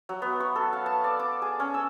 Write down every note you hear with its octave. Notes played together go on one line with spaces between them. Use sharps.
F#3
B3
C#6
A4
F5
A5
D5
D6
G#4
C#4
E6